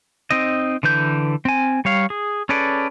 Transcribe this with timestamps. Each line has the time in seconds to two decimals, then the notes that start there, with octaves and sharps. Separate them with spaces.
0.30 C4 D#4 D#5
0.83 D3 E3 B4 G6
1.45 C4 G#5
1.85 G3 C#5 F5
2.10 G#4
2.49 C#4 G#4 A4 B4 D5